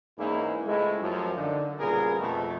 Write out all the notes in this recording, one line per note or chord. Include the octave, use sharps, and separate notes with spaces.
E2 G#2 A#3 C#4 D#4 E4
C#2 G#3 A3 C4 E4
F#2 F3
D3 D#3
C2 A#2 C#3 B3 G#4 A#4
F2 B2 A3